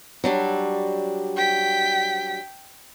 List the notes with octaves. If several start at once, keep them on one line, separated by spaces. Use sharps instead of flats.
F#3 G3 D4
G5 B6